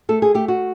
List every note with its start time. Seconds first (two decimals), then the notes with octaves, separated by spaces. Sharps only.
0.09 A3 A4
0.22 G#4
0.34 A3 G4
0.48 F#4